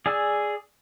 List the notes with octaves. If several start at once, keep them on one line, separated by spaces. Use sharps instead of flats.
G#4 D5 G#5 E6